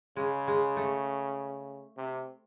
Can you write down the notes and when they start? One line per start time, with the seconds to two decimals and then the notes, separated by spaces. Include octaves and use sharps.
0.16 C#3 G#3
0.48 G#3
0.77 A3
1.97 C3